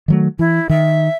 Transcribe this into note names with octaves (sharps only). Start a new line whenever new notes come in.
D#3 F#3 A3
E3 E4
D#3 E5